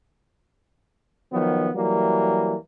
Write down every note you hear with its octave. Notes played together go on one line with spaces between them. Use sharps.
D#3 F3 F#3 B3
E3 F#3 G3 A#3